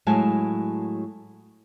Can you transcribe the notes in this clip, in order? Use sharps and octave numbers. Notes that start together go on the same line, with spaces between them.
A2 F#3 G#3 F5 G#5 A5